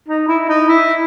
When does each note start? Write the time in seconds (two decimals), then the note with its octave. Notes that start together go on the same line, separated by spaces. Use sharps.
0.08 D#4
0.28 E4
0.49 D#4
0.68 E4